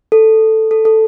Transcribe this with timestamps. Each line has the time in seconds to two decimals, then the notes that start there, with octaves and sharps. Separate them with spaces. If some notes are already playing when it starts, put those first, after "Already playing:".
0.12 A4
0.71 A4
0.85 A4